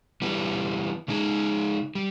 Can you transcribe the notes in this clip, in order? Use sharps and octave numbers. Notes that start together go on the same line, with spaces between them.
E3 G3 B3
C#3 G#3 D#4 G#4
G3